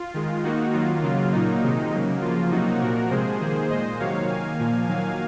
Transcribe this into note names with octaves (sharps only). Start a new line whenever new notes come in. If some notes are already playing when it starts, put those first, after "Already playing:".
Already playing: F4
D#3 G#3
D#3 A#3 D#4 F#4
D#3 F#3 A#3 F4
C#3 F#3 A#3 F4
A#2 F#3 A#3 D#4
C3 D#3 G#3
C#3 F#3 A#3
C#3 F3 A#3 F4
C3 F#3 A#3 D#4 F#4
A#2 F3 A#3 F#4 A#4
C3 F3 G#3 G#4 C5
D#3 A#3 G#4 C5
A#2 G#3 C5 D#5
C3 D#3 F#3 A#3 C#5 F5
D#3 A#3 F5 G#5
A#2 F3 A#3
D#3 F#3 A#3 F5 G#5